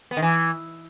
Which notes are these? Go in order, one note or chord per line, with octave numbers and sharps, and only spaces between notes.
B3
D#3
E3